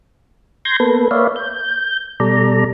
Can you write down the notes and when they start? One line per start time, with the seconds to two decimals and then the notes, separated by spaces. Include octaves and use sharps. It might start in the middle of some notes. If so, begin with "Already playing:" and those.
0.65 C6 G6 G#6 A#6
0.80 A#3 B3 A4 B4
1.11 A#3 B4 C#5 D5 E5 F5
1.36 G6
2.20 B2 G3 A4 D5 A#5